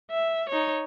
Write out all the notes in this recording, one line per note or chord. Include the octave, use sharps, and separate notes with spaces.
E5
D#4 C#5